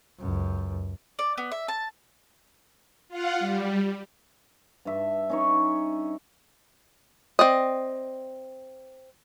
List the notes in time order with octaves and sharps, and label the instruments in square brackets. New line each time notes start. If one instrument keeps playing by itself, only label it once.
[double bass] C#2 F#2
[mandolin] D5
B3
E5
A5
[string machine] F4 F5 F#5
G3
[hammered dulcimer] G2 E5
C#4 D#4 C#5
[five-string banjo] C4 D5 D#5